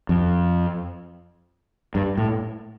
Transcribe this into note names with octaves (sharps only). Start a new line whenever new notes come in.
F2
G2
A2